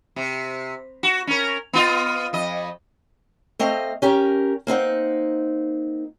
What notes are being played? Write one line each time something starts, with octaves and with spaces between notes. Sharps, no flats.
C3
F#4
C#4 A#4
B3 F4 D#5
F2 D#5
A3 C4 D#5 F5
C#4 G4 A#4
A#3 C4 D#4 F#5